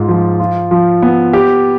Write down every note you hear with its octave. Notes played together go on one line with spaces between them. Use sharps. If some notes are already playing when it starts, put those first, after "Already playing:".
Already playing: G#2 F4
F3
F4
F3
B3
G4